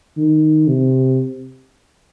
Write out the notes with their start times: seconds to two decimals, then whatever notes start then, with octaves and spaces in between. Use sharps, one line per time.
0.17 D#3
0.68 C3